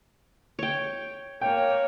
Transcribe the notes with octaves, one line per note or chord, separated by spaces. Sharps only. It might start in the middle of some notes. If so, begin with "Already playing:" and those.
C#5 G5
A#3 C#5 G5